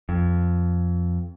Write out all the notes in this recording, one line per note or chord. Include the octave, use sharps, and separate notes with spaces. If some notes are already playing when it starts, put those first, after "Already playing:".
F2